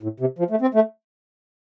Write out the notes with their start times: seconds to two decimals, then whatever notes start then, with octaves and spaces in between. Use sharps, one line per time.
0.03 A2
0.20 C3
0.39 F3
0.51 A3
0.61 C4
0.75 A3